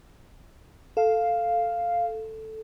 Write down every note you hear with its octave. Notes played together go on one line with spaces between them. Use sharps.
A4 F5